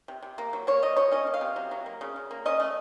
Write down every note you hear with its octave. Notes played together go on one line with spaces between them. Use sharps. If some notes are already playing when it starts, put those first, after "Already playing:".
C3
C3
A#3
F#3
A#3 C#5
F3 D#5
F3 C#5
C#4 D#5
A#3
F5
C3
F#3
F#3
A#3
C#3
C#3
A#3
C#4 D#5
A3